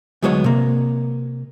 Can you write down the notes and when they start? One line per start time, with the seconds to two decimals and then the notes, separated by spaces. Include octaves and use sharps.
0.22 D2 F#3 G#3 B3 G#4 C#5
0.44 C3 A#3